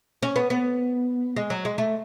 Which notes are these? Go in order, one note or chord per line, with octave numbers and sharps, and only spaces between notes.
C#4
B3
B3
G#3
F#3
G#3
A3